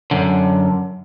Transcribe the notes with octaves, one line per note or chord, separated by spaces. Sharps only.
F#2 D3